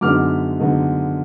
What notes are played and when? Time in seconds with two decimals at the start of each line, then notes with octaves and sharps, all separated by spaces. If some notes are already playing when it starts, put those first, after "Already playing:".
0.01 F#2 D3 G#3 B3 D#4 D6 F6
0.59 F#2 D3 G#3 B3 D#4